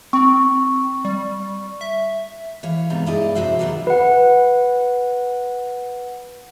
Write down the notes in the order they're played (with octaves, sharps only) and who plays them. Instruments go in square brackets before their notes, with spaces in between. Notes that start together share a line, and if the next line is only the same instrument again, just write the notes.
[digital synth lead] C4 [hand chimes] C#6
[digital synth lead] G3
E5
[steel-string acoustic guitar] E3 C#5 F5
G#2 C3 G3 B3 A#5
G2 G#3 E4 D5 D#5 G#5
F2 C3 C4 F#4 C5 E5
D#2 G#2 F#3 G3 A#3 D5
[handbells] B4 F#5